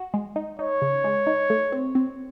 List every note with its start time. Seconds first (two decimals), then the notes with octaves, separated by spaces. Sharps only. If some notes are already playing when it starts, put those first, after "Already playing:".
Already playing: F#4
0.14 G#3
0.36 D#4
0.59 D#4 C#5
0.82 C#3
1.04 G#3
1.27 D#4
1.50 A3
1.72 C4
1.95 C4